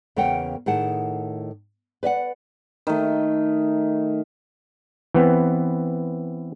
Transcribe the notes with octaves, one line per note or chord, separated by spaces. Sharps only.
E2 C#3 A#3 A#4 F#5 G5
A2 D#3 G#4 F#5 A5
B4 D5 E5 F#5
D#3 A3
E3 B3 C4